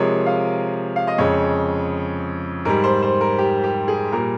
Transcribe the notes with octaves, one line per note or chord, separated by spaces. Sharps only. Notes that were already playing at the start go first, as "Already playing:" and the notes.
Already playing: C3 F3 G#3 A#4 C#5
F5
F5
D#5
F2 C#3 G#3 C#5
G#2 G3 A#4
C5
C5
A#4
G4
G4
G#4
A#2 G3 A#4